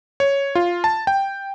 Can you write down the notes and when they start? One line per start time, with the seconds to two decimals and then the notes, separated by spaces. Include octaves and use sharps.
0.20 C#5
0.55 F4
0.84 A5
1.07 G5